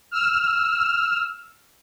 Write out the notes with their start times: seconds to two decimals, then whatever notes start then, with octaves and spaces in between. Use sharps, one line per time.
0.11 E6 F6